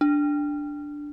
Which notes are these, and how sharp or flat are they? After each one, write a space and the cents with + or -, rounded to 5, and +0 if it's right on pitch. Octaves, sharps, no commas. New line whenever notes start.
D4 +0